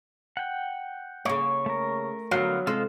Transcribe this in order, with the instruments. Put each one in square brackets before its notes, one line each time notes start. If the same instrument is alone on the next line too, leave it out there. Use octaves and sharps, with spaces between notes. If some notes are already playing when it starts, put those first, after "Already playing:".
[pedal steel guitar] F#5 G5
[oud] C#3 A#3 [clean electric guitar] C#5
[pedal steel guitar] A3 A#4
[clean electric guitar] D3 B3 F5 [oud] F#3
[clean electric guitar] C3 G#3 C4 [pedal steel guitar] F4 C5 D#5 [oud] A4